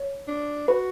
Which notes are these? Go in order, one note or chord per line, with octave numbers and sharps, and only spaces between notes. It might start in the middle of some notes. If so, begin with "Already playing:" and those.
Already playing: C#5
D4
F#4 B4